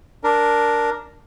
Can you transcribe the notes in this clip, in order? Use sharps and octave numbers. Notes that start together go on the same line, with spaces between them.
D4 A#4